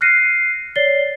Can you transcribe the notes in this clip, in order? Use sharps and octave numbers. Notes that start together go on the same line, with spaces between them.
F6 F#6 A#6 C7 C#7 D#7
C#5 D5 A6 C7 G7